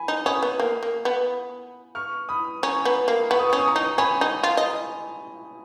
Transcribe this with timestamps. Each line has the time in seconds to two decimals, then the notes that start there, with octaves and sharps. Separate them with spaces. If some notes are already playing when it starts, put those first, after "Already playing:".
Already playing: G#5 B5
0.08 D#4
0.26 C#4 B5 D#6
0.43 B3
0.60 A#3
0.83 A#3
1.05 B3
1.95 C#6 F6
2.29 B5 D#6
2.63 C#4 A#5 C#6
2.85 B3
3.08 A#3
3.30 B3 C#6
3.39 D#6
3.50 C#4 C#6
3.59 D#6
3.68 A#5 C#6
3.76 D#4
3.98 C#4 G#5 B5
4.21 D#4
4.43 F4
4.57 D#5